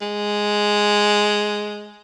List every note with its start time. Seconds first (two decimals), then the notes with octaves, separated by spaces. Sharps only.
0.01 G#3